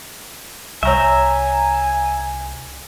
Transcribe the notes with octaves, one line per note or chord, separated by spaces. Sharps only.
C2 C#5 E5 G#5 A#5 C#6